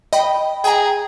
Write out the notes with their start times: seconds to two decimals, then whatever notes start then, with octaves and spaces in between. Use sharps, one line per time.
0.13 D#5 G5 B5
0.64 G#4 G5 A#5